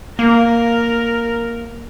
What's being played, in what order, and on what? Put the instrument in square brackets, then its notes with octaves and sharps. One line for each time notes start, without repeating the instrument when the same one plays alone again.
[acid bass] A#3 [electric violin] A#4